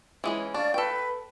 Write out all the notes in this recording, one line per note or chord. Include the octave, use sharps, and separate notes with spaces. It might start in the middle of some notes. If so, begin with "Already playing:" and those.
E3 G#3 C#4
D4 D5 F5 C#6
A4 B4 G5